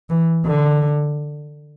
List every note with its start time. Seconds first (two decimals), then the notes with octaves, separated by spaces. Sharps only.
0.10 E3
0.45 D3